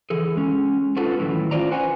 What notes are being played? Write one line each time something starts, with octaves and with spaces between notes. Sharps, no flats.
E3 G#4 A4
G#3 C#4
C#4 F4 F#4 A4 B4
A2 D#3 E3 F#3 E4
C#4 F4 A#4 C5 D5 A#5
F#4 B4 C5 F#5 G#5